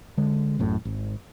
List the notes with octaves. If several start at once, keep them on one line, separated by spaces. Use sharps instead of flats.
D3 G#3
A1 F#2 A2
G#1